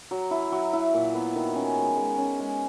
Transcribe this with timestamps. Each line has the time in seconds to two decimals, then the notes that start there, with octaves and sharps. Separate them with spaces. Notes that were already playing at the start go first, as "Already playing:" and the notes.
0.11 F#3
0.31 E4
0.52 F#3
0.73 E4
0.94 A#2
1.15 B3
1.35 D#3
1.55 C#4
1.76 G#3
1.97 G#3
2.18 C#4
2.39 G#3